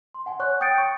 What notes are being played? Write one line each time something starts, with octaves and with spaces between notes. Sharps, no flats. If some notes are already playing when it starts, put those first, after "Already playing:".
C6
F#5 G#5
C#5 C#6 F#6
G5 D#6 G6 A6 C#7 D7
C#6